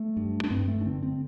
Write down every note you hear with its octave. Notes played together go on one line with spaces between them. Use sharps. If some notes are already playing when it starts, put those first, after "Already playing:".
Already playing: A3
G2
D4
G2 C4
A3
D4
D3 C4
C4